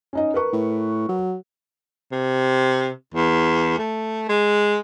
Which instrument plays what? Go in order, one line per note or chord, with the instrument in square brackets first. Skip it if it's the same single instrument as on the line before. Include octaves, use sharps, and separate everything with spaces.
[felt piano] C#4 D#4 D#5
A#4 B4 C#6
[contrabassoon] A2
F#3
[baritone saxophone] C3
E2
A3
G#3